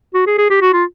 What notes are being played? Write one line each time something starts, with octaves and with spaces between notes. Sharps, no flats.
F#4
G#4
G#4
G4
F#4
F4